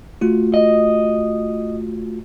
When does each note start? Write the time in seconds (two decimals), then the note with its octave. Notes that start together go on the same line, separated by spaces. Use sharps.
0.21 A3 F4 F#4
0.54 D#5